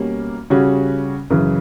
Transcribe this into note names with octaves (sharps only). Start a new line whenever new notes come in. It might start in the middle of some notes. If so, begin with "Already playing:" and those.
Already playing: B2 G3 A#3 C#4
C#3 G3 C#4 F#4
F#2 C#3 E3